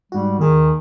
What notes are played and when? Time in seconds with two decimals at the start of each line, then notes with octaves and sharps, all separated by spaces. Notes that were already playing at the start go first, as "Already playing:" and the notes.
0.12 G#2 G3 F#4
0.39 D#2 D#3 G#4